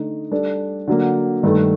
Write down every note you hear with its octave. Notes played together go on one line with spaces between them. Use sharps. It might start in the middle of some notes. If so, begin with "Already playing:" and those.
Already playing: D3 A3 D#4
G3 D4 A4
D3 F#3 A#3
G2 D#3 A3